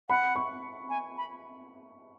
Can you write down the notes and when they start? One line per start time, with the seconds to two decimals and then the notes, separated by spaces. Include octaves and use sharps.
0.09 F#5 B5
0.36 C#6
0.90 G#5
1.17 B5